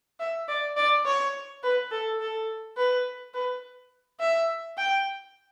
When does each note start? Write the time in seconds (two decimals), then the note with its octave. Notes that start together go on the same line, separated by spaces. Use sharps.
0.19 E5
0.48 D5
0.76 D5
1.05 C#5
1.63 B4
1.91 A4
2.20 A4
2.77 B4
3.34 B4
4.20 E5
4.77 G5